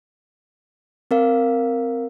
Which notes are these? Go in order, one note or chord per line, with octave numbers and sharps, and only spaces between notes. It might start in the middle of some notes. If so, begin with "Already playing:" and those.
C4 A#4 F5